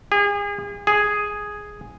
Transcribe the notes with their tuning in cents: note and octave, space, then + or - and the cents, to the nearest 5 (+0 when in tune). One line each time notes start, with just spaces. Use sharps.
G#4 -35
G#4 +0